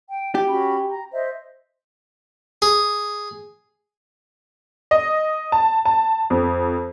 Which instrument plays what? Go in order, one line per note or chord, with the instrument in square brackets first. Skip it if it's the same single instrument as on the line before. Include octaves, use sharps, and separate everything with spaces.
[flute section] G5
[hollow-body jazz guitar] G4 [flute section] G5
[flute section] C#4 F#4 B5
A#5
C5 D#5 E5
[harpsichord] G#4
[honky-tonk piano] D#5
A5
A5
F2